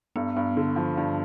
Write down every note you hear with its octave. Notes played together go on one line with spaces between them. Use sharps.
G2 B3
G2
D3
F3
G2